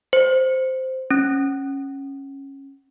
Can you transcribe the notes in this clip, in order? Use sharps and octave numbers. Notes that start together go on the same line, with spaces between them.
C5
C#4